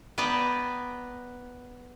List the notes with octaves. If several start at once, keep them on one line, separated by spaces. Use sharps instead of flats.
B3 B4 D5 G5 A5 A#5